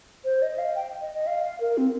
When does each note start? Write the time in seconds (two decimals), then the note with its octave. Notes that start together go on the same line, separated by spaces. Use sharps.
0.25 C5
0.42 D#5
0.58 F5
0.75 G5
1.01 D#5
1.15 D#5
1.27 F5
1.43 F5
1.60 A#4
1.77 C4